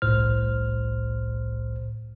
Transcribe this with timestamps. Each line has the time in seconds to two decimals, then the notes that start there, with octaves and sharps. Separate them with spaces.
0.02 G1 C2 A2 C5 F6